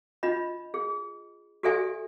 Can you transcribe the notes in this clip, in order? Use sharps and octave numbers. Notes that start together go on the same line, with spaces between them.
D4 F4 D#5 B5
G#4
F#4 G4 A4 D5 E5 G#5